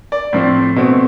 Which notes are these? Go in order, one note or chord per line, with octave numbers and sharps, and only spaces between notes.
D5
A2 F3 C4
B2 A3 C4